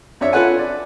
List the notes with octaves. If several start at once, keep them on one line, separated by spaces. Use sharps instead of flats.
F2 D4 C#5 E5
F4 A4 B4 C#5 F#5 G#5
D5